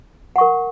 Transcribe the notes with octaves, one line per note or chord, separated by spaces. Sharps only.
A#4 F#5 C#6